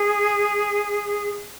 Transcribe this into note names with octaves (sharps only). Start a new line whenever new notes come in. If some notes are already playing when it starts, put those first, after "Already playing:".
Already playing: G#4